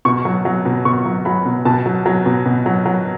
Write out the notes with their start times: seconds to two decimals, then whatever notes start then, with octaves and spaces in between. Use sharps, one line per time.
0.05 B2 C#6
0.25 F#3
0.45 F#3
0.65 B2
0.85 B2 C#6
1.05 F#3
1.25 F#3 B5
1.45 B2
1.65 B2 A5
1.86 F#3
2.06 F#3
2.26 B2
2.46 B2
2.66 F#3
2.86 F#3